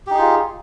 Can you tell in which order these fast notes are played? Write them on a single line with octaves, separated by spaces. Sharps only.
G4 D#4 G#4 F4